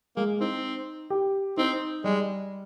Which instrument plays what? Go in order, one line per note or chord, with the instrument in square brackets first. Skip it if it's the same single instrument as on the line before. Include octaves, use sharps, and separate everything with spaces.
[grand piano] G#3 [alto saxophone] A#3
[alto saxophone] C4 [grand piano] D#4
[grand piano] G4
[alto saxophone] C4 [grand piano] D#4
[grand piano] G3 [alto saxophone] G#3